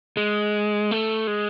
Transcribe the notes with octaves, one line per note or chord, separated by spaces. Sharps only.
G#3
A3
G#3